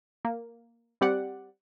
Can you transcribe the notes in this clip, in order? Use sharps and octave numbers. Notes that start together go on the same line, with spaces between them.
A#3
G3 C4 G4 D5 F#5